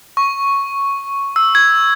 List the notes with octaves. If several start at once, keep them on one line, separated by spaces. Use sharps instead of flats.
C#6
E6
G#6